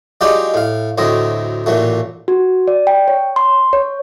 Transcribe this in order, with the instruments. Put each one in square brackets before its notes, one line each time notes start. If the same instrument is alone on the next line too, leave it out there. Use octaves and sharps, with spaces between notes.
[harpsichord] F#3 G#3 D#4 F4 G4 D5
A2 F5
D2 A2 F#3 C4 D#5
A1 A#2 F#3 A3
[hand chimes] F#4
D5
G5
C#5
C6
C#5